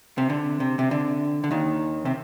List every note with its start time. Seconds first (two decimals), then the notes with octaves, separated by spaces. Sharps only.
0.18 C3
0.30 D3
0.60 C3
0.79 C3
0.91 D3
1.44 D3
1.51 D#2 D#3
2.05 C3